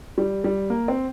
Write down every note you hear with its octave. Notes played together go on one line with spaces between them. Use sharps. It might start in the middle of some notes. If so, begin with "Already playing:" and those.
G3
G3
A#3
C4